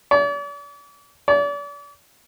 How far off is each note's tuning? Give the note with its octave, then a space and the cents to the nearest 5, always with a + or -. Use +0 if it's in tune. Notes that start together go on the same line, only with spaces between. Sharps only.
D5 -45
D5 -40